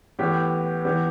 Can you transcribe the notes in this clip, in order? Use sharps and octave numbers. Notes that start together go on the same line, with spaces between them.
A2 E3 B3 G4
E3 B3 G4